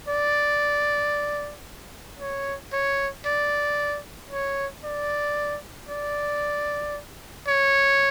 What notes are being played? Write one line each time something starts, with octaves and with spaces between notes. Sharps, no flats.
D5
C#5
C#5
D5
C#5
D5
D5
C#5